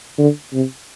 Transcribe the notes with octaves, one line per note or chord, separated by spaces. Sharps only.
D3
C3